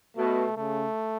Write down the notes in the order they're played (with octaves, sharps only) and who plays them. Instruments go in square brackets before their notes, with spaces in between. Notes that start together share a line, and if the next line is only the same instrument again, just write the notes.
[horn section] B2 [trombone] A3
[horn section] C#3 [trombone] A3